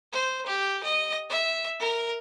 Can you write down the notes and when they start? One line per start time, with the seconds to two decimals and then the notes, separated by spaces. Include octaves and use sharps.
0.12 C5
0.46 G4
0.83 D#5
1.29 E5
1.80 A#4